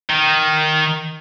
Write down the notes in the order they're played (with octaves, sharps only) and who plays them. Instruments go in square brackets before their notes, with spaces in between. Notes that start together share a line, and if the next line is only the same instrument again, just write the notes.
[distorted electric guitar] D#3